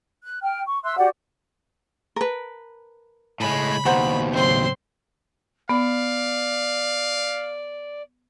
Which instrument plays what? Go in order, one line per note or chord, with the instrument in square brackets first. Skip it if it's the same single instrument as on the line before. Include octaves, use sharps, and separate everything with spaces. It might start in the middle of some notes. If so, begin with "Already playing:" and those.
[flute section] F#6
G5 F6
C#6
E5 C6 E6 F#6
F#4 G4 D5 F#5
[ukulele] A#4 B4 [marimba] A5
[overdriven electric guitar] A2 G#3 [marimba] C#3 G#5 [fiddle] B5
[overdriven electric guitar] D#2 B2 [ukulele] C5 F#5 A#5
[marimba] A2 C#3 F#3 [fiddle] C4 C6
[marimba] B3 [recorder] D5 [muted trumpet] F5